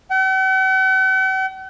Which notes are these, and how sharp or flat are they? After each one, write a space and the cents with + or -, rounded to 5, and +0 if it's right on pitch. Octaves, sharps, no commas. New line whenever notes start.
F#5 +45